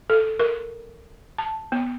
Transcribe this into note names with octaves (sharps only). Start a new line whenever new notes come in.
A4
A#4
A5
B3